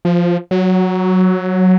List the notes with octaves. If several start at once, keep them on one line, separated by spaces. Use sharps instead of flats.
F3
F#3